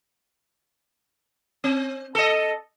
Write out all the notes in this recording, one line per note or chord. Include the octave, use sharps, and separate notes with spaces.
C4
A4 D#5